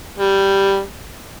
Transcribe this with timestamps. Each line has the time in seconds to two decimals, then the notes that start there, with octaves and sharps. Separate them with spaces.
0.18 G3